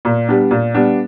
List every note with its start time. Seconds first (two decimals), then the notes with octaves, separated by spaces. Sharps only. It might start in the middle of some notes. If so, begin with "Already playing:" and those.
0.05 A#2
0.28 G3 B3 D4
0.51 A#2
0.75 G3 B3 D4